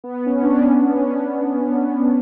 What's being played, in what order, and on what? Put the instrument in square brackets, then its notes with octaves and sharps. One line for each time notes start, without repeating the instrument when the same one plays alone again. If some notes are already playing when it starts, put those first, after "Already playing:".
[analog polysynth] B3
C#4
D4
C#4
D4
C#4